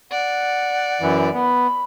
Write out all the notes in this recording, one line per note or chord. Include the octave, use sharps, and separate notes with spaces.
D5 F#5
F#2 E3
B3 B5